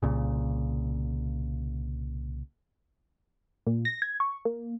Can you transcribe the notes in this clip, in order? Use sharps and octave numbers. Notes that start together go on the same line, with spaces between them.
C2 A#2 C#3
A#2
A#6
G#6
C#6
A#3